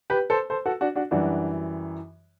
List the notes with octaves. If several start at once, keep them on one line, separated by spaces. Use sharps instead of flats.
G4 B4
A4 C5
A4 C5
F#4 A4
D4 F#4
D4 F#4
F#2 E3 G3 D4 F#4